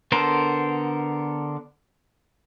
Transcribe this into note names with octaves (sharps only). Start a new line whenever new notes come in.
D3 B3 A4 A#4 C5